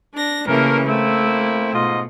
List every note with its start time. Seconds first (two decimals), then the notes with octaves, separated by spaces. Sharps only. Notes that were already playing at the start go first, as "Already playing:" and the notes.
0.14 D4 A#6
0.47 C#3 E3 A3 A#3 A#4
0.87 A3 A#3 C4 E4
1.73 G#2 B2 F4 D#5